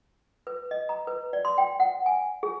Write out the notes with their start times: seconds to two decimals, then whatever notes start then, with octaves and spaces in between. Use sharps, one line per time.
0.47 B4
0.71 D#5
0.89 A#5
1.07 B4
1.33 D5
1.45 C6
1.58 G5
1.80 F#5
2.06 G#5
2.43 G#4